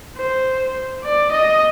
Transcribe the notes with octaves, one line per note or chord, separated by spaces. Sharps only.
C5
D5
D#5